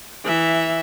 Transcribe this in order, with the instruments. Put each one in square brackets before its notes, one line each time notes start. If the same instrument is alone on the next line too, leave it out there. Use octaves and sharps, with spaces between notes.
[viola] E3 E5